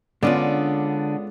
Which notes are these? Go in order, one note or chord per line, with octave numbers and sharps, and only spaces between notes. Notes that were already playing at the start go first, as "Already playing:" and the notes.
D3 G#3 B3 C#4 D4 F4 D5